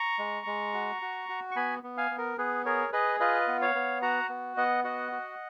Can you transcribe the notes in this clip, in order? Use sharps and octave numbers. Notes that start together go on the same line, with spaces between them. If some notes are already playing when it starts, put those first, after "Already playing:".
Already playing: A#5 C#6
G#3
G#3
F#4
F#4
F#4
C#6
B3 G#5 B5
B3
F5 G#5
B3
A#4
B3 G#4 B4
G#4 A#4 C#5
G#4 B4 D#5
F4 B4 D#5
B3
C#5 F5
B3
F#4 F#5 A#5
B3
B3 D#5 F#5
F#4 D#5 F#5
F#4